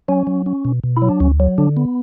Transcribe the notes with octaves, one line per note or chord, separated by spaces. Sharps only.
F#3 C#4
F#3
C#4
B2
B2
E4
F#3
D4
D2 C#4
F#3
D3 D4
B3